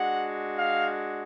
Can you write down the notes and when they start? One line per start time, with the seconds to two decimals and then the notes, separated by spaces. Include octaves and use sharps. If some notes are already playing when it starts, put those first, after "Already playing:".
Already playing: G#3 D4 F#4 F#5
0.54 F5